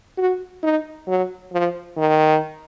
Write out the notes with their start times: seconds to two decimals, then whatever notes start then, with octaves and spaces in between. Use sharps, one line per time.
0.18 F#4
0.63 D#4
1.08 F#3
1.53 F3
1.97 D#3